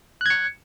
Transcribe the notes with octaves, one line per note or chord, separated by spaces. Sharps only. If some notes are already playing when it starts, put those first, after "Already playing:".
F#6 G#6 C#7